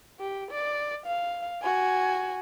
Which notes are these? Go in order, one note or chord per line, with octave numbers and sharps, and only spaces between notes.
G4
D5
F5
F#4 G#5